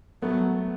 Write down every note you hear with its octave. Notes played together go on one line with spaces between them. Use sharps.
F#3 A3 B3